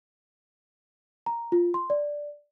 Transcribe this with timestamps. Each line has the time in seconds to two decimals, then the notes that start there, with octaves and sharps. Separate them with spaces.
1.26 A#5
1.52 F4
1.74 C6
1.90 D5